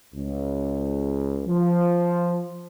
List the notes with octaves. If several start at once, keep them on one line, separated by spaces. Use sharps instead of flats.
C#2
F3